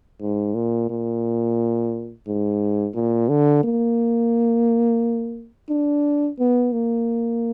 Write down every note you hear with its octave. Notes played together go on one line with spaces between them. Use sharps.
G#2
A#2
A#2
G#2
A#2
D3
A#3
D4
B3
A#3